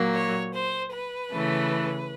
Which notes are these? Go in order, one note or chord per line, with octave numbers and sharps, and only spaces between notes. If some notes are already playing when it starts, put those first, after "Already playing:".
Already playing: A#2 F#3 A#3
C#5
C5
B4
C#3 E3 A3